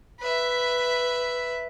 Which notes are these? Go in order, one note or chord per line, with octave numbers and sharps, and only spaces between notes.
B4 E5